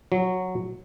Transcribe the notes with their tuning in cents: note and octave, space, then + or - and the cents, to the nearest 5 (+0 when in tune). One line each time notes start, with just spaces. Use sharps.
F#3 -5